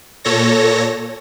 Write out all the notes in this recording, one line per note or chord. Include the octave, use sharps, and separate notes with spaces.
A#2 A4 C#5 A#6